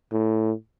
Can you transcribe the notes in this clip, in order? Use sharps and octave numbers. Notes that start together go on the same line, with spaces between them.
A2